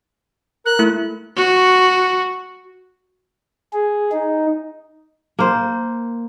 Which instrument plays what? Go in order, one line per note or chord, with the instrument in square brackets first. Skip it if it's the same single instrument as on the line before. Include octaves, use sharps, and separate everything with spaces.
[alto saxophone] A#4 [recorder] F#6
[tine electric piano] A3 E4
[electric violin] F#4
[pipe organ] G#4
D#4
[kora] A#3 C5